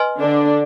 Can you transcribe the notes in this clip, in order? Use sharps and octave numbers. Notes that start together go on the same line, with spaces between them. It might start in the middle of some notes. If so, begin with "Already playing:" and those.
Already playing: B4 D#5 G#5 C6 F6
D3 D4